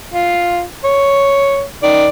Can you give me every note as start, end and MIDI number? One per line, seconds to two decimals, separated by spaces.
0.14 0.62 65
0.85 1.62 73
1.83 2.07 51
1.83 2.07 74